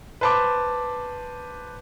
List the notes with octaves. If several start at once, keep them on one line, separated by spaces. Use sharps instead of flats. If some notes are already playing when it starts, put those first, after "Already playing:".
B4 C5 A5 B5 D6